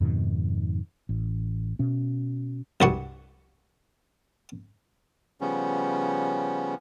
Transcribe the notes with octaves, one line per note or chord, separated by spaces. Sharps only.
F2 G#2 B2 D#3
A1
B2 C#4
C2 G2 F#4
C#3 F3 G3 B3 C#4